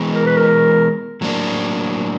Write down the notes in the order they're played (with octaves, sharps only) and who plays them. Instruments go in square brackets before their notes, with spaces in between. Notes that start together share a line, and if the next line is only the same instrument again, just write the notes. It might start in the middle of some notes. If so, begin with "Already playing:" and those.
Already playing: [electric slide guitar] E3 G#3 B3
[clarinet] A#4
B4
A#4
[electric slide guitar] A2 F#3 A#3 D4